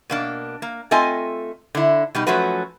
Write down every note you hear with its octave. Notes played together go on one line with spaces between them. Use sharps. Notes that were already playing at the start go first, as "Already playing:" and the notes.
B2 A#3 D4
A#3
A3 C4 F4 D#5 G#5
D3 E4
B2 G3 D#4
F3 F#3 A3 C#4 F#4 B4